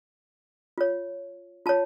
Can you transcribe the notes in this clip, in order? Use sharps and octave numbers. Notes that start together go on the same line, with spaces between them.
F4 C#5
F4 C#5 A5